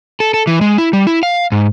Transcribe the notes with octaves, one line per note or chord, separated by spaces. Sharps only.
A4
A4
E3
G#3
E4
G3
E4
F5
G#2